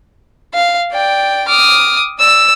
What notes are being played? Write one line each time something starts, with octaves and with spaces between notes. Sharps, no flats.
F5
D5 G5
D6 D#6 F6
D5 E6